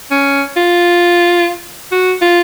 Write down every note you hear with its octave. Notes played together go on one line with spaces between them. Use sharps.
C#4
F4
F#4
F4